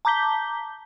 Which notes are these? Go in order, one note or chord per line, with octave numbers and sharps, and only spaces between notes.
A5 A#5 D6 G6 B6 G7